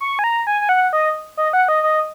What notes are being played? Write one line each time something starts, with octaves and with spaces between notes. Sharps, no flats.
C#6
G#5
A#5
G#5
G#5
F#5
D#5
D#5
F#5
D#5
D#5